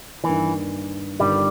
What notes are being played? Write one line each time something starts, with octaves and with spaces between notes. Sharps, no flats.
G2 D#3 E3 A#3
G1 G2 D#3 G3